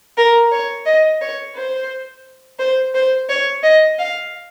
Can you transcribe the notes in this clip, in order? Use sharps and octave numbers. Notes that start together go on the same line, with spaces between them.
A#4
C#5
D#5
C#5
C5
C5
C5
C#5
D#5
F5